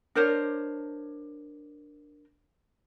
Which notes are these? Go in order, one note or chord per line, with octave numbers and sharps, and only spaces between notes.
D4 A#4 C5 C#5